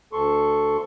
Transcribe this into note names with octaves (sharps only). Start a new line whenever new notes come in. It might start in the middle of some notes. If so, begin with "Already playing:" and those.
D2 A4 C6 C#6